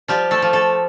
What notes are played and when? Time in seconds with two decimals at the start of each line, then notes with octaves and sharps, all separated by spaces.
0.08 F3 G3 G4
0.31 A3 A4
0.42 F3
0.53 A3 A4